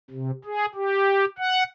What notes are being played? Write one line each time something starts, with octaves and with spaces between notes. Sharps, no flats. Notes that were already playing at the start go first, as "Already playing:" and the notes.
C3
G#4
G4
F#5